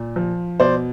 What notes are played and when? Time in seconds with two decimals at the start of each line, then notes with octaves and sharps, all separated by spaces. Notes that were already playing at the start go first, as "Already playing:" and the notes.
Already playing: A#2
0.16 F3
0.60 B2 C5 D5